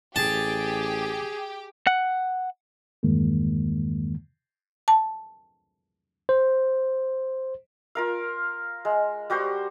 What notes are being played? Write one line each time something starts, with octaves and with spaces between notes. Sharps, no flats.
A1 G4 G#4 A5
F#5
E2 G2 D#3 G#3 A#3
A5
C5
F4 A#4 F5
G#3
G3 F#4 G4 C5